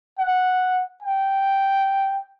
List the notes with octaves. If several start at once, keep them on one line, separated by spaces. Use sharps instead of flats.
F#5
G5